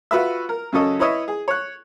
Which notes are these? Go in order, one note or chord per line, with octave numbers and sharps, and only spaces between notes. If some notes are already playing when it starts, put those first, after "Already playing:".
F4 F#4 B4 E5
A#4
F#2 C#3 F#3 C#4 A4 D#5
E4 B4 C#5 D#5 E5
G#4
C#5 F#6